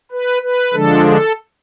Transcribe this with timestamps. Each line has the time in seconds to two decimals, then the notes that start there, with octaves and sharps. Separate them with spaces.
0.11 B4
0.43 B4
0.73 D3 F3 G#3 D4 A4
1.05 A4